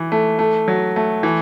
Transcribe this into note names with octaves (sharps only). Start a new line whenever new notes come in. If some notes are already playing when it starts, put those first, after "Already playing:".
Already playing: E3
A3
A3
F#3
A3
E3